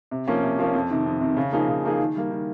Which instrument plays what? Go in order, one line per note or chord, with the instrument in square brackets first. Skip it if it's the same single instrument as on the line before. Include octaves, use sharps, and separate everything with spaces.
[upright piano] C3
F3 A#3 C#4
C3
F3 A#3 C#4
F2
C3 D#3
F2
C3 D#3
C#3
F3 A#3 D#4 G#4
C#3
F3 A#3 D#4 G#4
D#3
G3 A#3
D#3